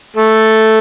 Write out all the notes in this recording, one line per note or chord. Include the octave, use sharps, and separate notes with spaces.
A3